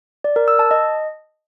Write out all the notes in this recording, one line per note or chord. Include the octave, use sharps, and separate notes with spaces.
D5
A#4
E6
A5
D#5